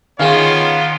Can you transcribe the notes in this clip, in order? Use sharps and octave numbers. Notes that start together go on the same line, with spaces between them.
D#3 B3 C#4 F4 G#4 C#5 F5